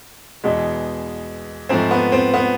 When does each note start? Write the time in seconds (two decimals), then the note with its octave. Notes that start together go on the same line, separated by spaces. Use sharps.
0.44 E2 B2 G#3
1.69 G#2 F3 A3 C4
1.91 B3
2.12 C4
2.34 B3